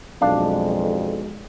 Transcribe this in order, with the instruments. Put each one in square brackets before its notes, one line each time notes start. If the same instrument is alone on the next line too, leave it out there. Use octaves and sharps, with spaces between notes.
[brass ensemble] B1 G#3 [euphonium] F2 [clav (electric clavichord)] D4 [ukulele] F5